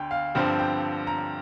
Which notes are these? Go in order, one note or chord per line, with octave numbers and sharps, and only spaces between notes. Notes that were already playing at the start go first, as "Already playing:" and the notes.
Already playing: D2 D3 G5
F5
G2 D3 F3 C4 G5
G5
A#5